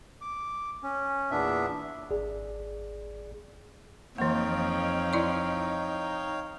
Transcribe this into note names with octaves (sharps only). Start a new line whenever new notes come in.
D6
C#4
E2 A#2 B3 D4 E5
G#1 G#4 D5
F2 E3 A#3 D#4 C#5 F5 G5
E4 D5 C#6